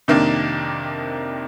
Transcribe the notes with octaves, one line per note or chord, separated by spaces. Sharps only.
F2 C3 D#3 A#3 D4